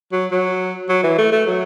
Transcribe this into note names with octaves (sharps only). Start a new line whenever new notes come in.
F#3
F#3
F#3
E3
A3
A3
F#3